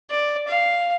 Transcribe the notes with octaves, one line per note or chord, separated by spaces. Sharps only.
D5
F5